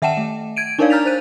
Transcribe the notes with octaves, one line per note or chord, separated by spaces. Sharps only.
D#3 E5 F#5 G5 A5 E7
A3
G#6 D7 D#7
D4 D#4 A#4 C#5 D5 F5
A#5 F6 G6 A6 B6 F7
C5 F#6 D#7